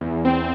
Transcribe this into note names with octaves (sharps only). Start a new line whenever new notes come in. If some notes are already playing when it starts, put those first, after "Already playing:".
E2
C4